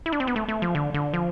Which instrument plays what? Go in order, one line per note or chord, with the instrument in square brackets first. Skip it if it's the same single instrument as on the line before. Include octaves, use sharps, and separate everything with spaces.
[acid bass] E4
D4
C4
B3
A3
A3
F3
D3
D3
F3